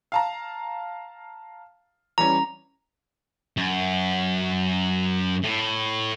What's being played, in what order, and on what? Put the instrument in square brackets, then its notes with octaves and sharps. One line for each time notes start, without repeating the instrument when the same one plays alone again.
[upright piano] F5 A5 A#5
[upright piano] E3 G3 C#4 [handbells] A#5
[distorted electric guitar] F#2
A2